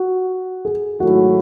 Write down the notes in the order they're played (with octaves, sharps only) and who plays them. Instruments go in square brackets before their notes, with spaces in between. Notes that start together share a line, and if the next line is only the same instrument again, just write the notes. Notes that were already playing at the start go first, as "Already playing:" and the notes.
Already playing: [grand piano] F#4
G#4
[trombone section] G#2 D#3 F#3 A3 E4 [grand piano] F#4